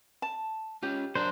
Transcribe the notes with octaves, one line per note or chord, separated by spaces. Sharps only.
A5
C#4 F4 G4
F#3 D4 A#4 C5